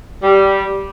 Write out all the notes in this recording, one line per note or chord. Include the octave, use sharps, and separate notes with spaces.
G3